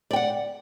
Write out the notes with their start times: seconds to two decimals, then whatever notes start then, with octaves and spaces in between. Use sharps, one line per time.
0.11 D5
0.13 G5
0.16 F#5